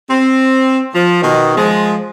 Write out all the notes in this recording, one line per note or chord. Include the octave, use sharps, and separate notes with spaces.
C4
F3
B2 D#3
F3 G#3